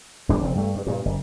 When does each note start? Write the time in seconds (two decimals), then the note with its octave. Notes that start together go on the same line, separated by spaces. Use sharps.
0.29 D#1 G2 B2 D4
0.41 F1 C4
0.55 G2 A3
0.75 G2
0.87 G2 A#2
1.05 F#1